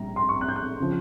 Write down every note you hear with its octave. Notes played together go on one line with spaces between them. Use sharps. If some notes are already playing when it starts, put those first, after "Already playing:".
Already playing: A#1 G3 A#5
C6
C#6
F#6
G6
F#6
C#3 F3